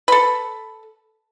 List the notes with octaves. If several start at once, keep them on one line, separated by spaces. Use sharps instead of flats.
A4 B4